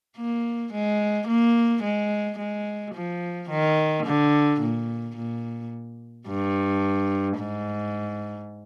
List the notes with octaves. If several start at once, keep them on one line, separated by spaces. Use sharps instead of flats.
A#3
G#3
A#3
G#3
G#3
F3
D#3
D3
A#2
A#2
G2
G#2